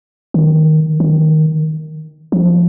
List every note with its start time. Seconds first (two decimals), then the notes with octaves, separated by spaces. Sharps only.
0.34 D#3
1.00 D#3
2.32 F3